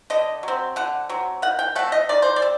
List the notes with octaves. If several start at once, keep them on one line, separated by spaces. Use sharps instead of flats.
D3 D#5
F#3 C4
D3 F#5
F#3 C4
D#3 F#5
G5
A3 C4 F#5
D#5
D#3 D5
C5
D5
C4